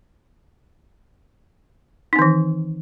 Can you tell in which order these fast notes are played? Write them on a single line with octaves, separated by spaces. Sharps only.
D#4 C4 D#3 E3